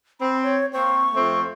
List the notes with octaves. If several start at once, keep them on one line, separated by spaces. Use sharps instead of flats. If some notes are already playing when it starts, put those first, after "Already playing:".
C4 B5
C#5
A#3 C4 C#6
F2 A3 C4